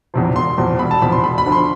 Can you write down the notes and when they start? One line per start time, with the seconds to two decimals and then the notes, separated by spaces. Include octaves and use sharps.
0.14 E2 C3 F3
0.35 E1 C6
0.58 E2 C3 F3
0.79 E1 B5
0.91 A5
1.02 E2 C3 F3 B5
1.12 C6
1.23 E1 B5
1.38 B5
1.46 D2 D3 F3
1.52 C6